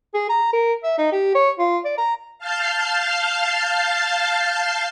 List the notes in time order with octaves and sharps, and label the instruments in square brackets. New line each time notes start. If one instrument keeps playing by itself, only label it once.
[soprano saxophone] G#4
A#5
A#4
E5
D#4
G4
C#5
F4
D5
A#5
[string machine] F5 A5 F6 G6 A6 C7